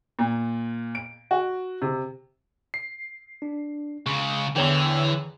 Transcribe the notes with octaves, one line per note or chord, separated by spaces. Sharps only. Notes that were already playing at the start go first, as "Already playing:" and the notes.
A#2
D7
F#4
C3
C7
D4
C#2 C#3 C#6
E2 D3 E3 C#5 G5